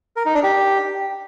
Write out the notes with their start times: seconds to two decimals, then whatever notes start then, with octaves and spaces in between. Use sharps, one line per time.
0.16 A#4
0.25 D#4
0.34 D4
0.43 G4